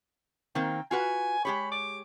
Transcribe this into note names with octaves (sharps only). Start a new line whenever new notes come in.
D#3 A#3 C4 G5
F4 F#4 B4 G#5
G#3 G4 C#5 B5
D6